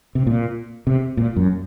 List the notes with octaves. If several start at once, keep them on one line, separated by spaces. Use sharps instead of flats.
C3
A#2
C3
A#2
F#2